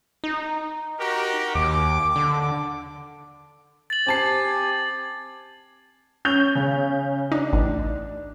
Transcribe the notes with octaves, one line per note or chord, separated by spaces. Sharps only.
D#4
F#4 G4 A#4
D#2 D6
D3
A6 F#7
C4 G4 G#5 A5 C7
C#4 G6 F7
C#3
D4 D#4
A1